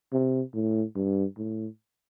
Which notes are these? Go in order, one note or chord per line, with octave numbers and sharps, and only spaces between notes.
C3
A2
G2
A2